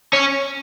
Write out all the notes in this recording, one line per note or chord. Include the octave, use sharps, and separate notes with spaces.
C#4